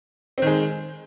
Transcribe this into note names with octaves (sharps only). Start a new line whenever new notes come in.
D#3 G#3 C4